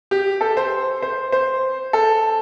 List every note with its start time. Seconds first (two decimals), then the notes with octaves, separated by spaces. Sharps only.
0.11 G4
0.41 A4
0.57 C5
1.02 C5
1.32 C5
1.93 A4